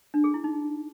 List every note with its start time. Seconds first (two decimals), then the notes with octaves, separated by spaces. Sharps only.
0.14 D4
0.24 G#4
0.34 E4
0.44 D#4